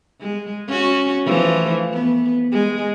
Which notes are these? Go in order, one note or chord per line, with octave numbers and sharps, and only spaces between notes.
G#3
C#4 F#4
E3 F3 A3
B3
G#3